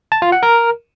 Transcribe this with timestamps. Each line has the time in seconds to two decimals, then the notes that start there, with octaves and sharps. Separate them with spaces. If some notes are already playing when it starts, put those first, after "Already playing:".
0.12 A5
0.22 F4
0.32 F#5
0.43 A#4